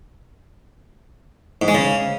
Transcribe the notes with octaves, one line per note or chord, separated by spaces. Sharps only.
G#2
G#3
C#3